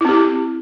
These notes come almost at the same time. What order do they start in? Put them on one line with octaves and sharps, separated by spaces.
E4 C4 G4